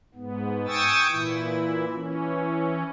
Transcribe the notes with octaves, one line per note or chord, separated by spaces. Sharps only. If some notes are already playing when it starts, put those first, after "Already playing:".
G#2 B3
G5 G#5 C#6 D#6 E6 A6
A#2 E3 E4
E3 C#4